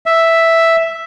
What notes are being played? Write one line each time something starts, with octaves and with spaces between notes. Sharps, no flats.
E5